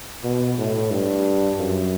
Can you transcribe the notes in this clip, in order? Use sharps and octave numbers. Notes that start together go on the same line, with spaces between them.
B2
A2
G2
F#2